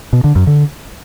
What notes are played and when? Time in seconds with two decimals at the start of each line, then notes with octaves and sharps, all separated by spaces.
0.13 B2
0.24 D3
0.36 F#2
0.47 D3